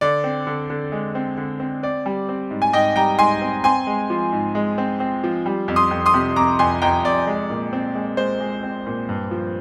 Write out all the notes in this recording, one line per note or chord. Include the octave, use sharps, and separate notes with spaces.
D3 D5
C4
D3
D3
G#3
C4
D3
C4
C4 D5
G3
C4
G#2
G#5
G#2 D#5 G5
G3 G5 A#5
G#2 G#5 C6
C4
C4 G#5 C6
G#3
F3
G#2
G#3
C4
C4
F3
G3
F2
C6 D#6
F2
C6 D#6
C3
F2 A#5 D6
F2 G#5 C6
F2 G5 A#5
F2 D5
G#3
A#2
C4
G#3
G#3 C5
G#3
C4
A#2
G2
F3